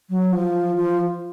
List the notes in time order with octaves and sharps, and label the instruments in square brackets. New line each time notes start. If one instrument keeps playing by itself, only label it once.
[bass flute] F#3
F3
F3